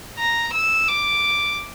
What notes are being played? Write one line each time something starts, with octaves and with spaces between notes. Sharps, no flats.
A#5
E6
D6